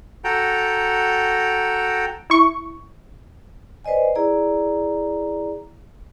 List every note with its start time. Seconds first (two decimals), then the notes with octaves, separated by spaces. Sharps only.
0.24 F#4 A4 G5 A#5
2.30 E4 C#6
3.85 B4 C5 D5 D#5 G#5
4.16 E4 G#4 D5 A#5